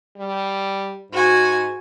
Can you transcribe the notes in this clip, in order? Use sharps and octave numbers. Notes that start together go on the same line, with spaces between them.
G3
G#2 F#4 G#5